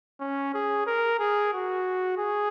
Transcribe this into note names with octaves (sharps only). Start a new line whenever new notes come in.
C#4
G#4
A#4
G#4
F#4
G#4